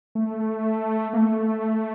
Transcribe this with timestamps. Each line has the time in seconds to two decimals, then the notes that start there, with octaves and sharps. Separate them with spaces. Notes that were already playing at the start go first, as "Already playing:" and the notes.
0.15 A3
1.13 A#3
1.18 A3